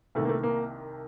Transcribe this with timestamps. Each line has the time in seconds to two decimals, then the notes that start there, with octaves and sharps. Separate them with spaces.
0.15 C2 C3 D#3 A3
0.25 A#3
0.29 A3
0.43 A#3